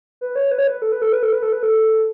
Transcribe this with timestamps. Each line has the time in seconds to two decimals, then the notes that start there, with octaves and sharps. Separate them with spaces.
0.21 B4
0.36 C#5
0.51 B4
0.58 C#5
0.67 B4
0.82 A4
0.92 B4
1.02 A4
1.12 B4
1.23 A4
1.32 B4
1.43 A4
1.53 B4
1.63 A4